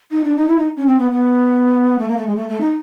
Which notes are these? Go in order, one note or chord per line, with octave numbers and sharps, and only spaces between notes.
D#4
D4
D#4
E4
D#4
C#4
C4
B3
B3
A3
A#3
A3
G#3
A3
A3
D#4